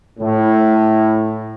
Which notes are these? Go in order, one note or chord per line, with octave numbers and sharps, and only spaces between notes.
A2